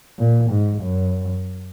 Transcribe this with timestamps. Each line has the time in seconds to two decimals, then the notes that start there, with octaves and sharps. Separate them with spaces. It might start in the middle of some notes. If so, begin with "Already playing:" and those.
0.19 A#2
0.51 G#2
0.82 F#2